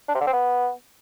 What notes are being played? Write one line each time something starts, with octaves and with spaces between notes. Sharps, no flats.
D4
C3
D3
C4
B3